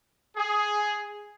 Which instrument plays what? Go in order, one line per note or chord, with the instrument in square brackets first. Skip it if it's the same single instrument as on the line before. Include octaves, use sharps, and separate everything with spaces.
[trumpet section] G#4